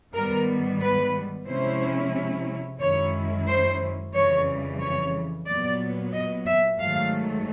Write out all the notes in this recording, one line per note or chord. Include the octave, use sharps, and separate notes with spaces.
G#2 D#3 G3 B3 A#4
B4
C3 F3 G#3 C#4 E4 C5
F#2 D#3 G#3 C#4 E4 C#5
C5
F2 C#3 E3 G3 C#5
C#5
A#2 F#3 B3 D5
D#5
E5
G#2 D#3 F#3 A3 F5